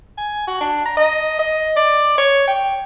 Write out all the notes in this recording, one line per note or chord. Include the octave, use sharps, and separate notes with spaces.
G#5
F#4
D4
A#5
D#5
D#5
D5
C#5
G5